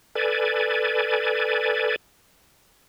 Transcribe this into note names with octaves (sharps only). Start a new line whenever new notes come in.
A4 B4 D5 G#5